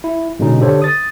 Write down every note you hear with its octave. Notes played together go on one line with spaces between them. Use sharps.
E4
G#2 B2 D3 G#3 C#4 D#4
D3 D4 G4 A4 C5 C#5
D#6 A6